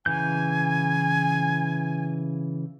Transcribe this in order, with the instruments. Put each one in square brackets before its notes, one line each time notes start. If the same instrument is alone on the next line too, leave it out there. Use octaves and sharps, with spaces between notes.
[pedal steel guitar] C#3 E3 G6 [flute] G#5